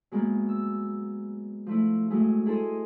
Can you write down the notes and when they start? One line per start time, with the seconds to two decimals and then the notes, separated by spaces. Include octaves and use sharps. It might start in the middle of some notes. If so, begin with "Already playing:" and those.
0.11 F#3 G#3 A#3 B3
0.49 E6
1.66 F3 A3 E4
2.10 F#3 G#3 A3 E4 G#4
2.46 E4 G#4 A4 C5 D#5